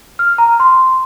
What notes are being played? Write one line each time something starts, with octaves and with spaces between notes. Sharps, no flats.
F6
A#5
C6